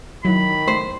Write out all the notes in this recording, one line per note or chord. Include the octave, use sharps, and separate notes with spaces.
D#3 F#3 E4 B5
A3 C5